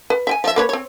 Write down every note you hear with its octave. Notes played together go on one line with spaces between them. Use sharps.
B4
E5 G5 G#5
F3 E5
A#3 B4 C#5
C4 C#5